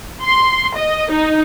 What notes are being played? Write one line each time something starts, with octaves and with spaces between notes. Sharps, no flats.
C6
D#5
D#4